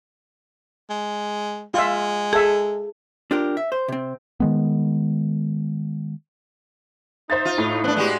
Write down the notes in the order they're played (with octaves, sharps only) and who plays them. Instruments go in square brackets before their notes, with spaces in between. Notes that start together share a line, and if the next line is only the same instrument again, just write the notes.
[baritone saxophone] G#3
[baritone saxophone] G#3 [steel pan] F4 E5
[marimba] G#4 [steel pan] A4 E5
[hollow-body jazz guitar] D4 F4 G4 A#4
E5
C5
C3 C4
[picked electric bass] D#3 G#3 B3
[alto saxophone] D#4 [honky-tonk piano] C5 E5 A6
[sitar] F4
[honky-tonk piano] A2
[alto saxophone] B3 [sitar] C4 D4
[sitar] G#3 F#4 G4